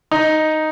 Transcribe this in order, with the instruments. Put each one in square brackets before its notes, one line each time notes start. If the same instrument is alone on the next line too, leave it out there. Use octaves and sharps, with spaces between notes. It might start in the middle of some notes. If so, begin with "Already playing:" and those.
[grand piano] D#4